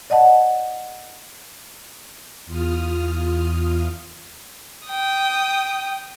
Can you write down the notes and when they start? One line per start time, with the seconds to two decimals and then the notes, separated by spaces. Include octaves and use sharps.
0.10 D5 D#5 F#5 A5
2.46 E2 F4 D#6 F6
4.88 G5 D#6